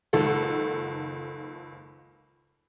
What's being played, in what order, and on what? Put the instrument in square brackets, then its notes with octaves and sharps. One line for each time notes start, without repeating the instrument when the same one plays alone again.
[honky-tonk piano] F#1 C#2 D#3 A4 F#5